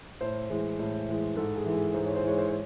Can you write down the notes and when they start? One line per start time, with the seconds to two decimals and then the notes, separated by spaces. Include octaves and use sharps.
0.21 A2 C5
0.49 E3 G#3
0.79 A2
1.08 E3 G#3
1.36 G#2 A4
1.55 G#4
1.65 E3 G#3
1.75 G#4
1.94 G#2 C5
2.05 C#5
2.16 C5
2.23 E3 G#3 C#5
2.38 C5
2.48 C#5